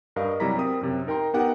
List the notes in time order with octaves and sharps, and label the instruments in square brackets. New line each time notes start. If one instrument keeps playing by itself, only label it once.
[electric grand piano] G2 A#4 D#5 F5
C3 F#3 G3 E4 A#5 B6
C4 A#4 D#6
F#2 C3
D#4 A#4 G5 A#5 C6
B3 D#4 G4 A#4 F#5 G5